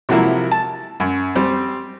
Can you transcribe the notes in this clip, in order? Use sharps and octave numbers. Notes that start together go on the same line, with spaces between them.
C3 F3 F#3 A#3 E4
A5
F#2
G3 C4